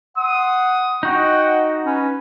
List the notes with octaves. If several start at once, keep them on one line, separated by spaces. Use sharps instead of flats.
F#5 C6 D#6
D#4 F#4 D#5 F#5 G5
C#4 B4